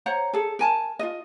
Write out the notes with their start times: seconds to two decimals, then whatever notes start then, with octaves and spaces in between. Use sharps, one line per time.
0.06 C5 C#5 F#5 A#5
0.33 G#4 A4
0.59 A#4 G#5 A5
0.99 F4 D#5